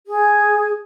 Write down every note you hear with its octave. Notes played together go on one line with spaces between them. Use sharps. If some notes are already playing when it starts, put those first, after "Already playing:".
G#4